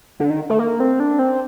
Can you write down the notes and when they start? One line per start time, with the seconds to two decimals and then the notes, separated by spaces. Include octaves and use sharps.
0.20 D3
0.30 D#3
0.50 A3
0.59 A#3
0.80 C4
1.00 D4
1.19 C4